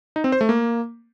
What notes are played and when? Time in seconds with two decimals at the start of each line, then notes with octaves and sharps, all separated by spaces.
0.16 D#4
0.24 C4
0.32 C5
0.41 A3
0.49 A#3